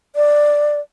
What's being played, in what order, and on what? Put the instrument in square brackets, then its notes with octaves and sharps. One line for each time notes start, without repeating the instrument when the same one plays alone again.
[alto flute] D5